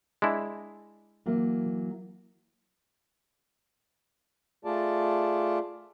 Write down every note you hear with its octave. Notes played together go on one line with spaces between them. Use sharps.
G#3 D4 E4
E3 F#3 A#3
A3 F4 G#4 D5 A5